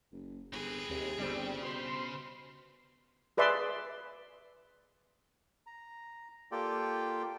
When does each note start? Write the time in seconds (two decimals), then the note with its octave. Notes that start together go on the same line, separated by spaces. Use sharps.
0.12 F#1
0.53 G1 C4 G#4 B4
0.90 D#2 C3
1.19 G1 C#3 G3 C4
1.62 B2 C5 B5 C6
3.37 G#4 B4 D5 E5 C6
5.67 A#5
6.52 A#3 F4 G4 A4 D5 G5